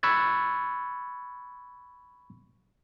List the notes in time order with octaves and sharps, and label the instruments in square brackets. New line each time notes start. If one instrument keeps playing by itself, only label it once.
[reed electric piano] B5 C#6 E6 F#6 G#6 A6